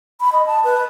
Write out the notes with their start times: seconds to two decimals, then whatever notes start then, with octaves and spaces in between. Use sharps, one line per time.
0.20 B5
0.32 D#5
0.46 A5
0.64 B4